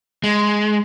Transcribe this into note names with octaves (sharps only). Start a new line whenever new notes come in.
G#3